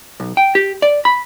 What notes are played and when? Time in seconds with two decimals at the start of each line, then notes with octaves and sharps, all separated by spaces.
0.20 B1
0.37 G5
0.55 G4
0.82 D5
1.05 B5